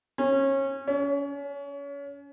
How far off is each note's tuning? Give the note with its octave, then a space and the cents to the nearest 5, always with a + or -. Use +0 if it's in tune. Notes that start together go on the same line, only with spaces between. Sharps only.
C#4 -25
C#4 +30